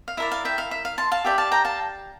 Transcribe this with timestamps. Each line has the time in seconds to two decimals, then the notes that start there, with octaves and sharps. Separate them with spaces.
0.08 F5
0.17 E4 A#4 D5 E5
0.32 F5
0.45 E5 G5
0.58 F5
0.71 E5
0.85 F5
0.98 A5 C6
1.12 F5 A5
1.24 G4 D5 E5 G5
1.38 F5 A5
1.52 G5 A#5
1.65 F5 A5